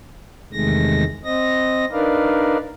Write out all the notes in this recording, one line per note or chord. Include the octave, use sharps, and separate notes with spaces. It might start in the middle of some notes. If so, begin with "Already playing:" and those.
E2 C3 D#3 G#3 A3 A#6
C4 D#5 A#6
D4 D#4 A#4 B4 D5 F5